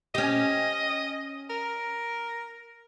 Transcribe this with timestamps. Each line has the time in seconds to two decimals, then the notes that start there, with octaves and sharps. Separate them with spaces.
0.15 C#4 G4 D#5
1.50 A#4